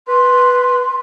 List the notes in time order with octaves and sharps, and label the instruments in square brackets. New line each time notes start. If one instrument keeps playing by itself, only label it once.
[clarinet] B4 [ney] C6